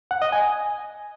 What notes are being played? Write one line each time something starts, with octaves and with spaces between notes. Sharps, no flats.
F#5
D#5
G#5